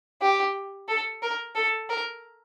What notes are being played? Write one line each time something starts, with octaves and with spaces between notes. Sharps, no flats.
G4
A4
A#4
A4
A#4